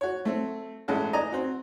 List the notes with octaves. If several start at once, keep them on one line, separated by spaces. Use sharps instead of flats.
F#4 C#5
A3 C4
A1 G#3 C#4 A4 F#5
D5 D#5 G#5 A#5
C4 F#4